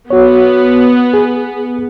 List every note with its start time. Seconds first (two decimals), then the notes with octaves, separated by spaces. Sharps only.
0.10 B3 F#4 C#5
1.14 G#4